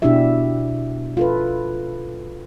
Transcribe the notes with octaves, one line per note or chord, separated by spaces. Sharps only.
B2 D4 E4 F#4 G4 E5
F4 A4 B4